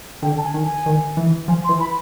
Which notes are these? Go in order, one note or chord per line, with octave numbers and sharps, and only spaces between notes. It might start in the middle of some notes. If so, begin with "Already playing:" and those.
D3 G5
A5
G#5
D#3
G#5
D#3
E3
F3 G#5
C6
E3
B5